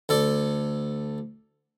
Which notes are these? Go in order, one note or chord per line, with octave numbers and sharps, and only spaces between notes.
D2 A4 D5